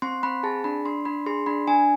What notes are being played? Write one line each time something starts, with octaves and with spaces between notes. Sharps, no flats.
C4 C6
C4 B5
G#4 A5
D4 B5
D4 C6
D4 B5
G#4 C6
D4 B5
D4 G#5